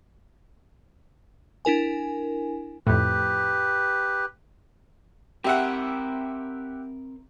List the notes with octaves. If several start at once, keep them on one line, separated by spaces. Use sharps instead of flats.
D4 E4 A#4 G#5
F2 A2 G4 B4
C4 G4 A#4 E5 F#5